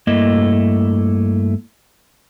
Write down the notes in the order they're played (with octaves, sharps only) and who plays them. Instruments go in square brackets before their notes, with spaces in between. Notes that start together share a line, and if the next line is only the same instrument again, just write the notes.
[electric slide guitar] G2 A3 A#3 E4 D#5